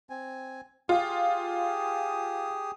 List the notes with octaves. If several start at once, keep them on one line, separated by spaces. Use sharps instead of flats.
C4 G#5
F4 G4 G#4 D#6